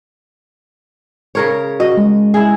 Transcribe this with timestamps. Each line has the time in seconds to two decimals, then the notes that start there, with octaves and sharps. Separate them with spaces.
1.35 C#3 A#4 C#5
1.80 F#4 D#5
1.98 G#3
2.34 E4 G#4